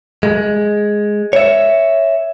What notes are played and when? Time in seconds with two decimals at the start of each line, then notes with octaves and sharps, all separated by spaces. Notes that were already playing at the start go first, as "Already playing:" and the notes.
0.23 G#3
1.33 C#5 E5